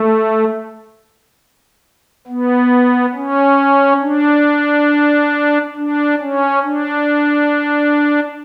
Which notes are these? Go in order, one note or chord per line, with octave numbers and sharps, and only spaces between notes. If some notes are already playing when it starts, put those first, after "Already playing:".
Already playing: A3
B3
C#4
D4
D4
C#4
D4